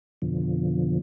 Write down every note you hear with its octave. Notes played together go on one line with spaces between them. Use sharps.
F2 B2 D3 F3